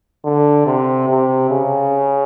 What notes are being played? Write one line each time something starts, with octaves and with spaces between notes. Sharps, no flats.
D3
C3
C3
C#3